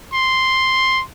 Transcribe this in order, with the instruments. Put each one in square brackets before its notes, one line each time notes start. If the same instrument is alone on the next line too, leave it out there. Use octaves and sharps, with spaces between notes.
[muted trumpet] C6